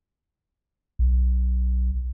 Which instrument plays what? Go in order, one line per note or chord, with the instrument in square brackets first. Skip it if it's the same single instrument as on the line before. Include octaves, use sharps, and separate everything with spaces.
[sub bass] B1